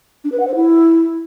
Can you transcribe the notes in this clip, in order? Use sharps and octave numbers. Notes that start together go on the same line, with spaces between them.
D4
B4
F#5
C5
E4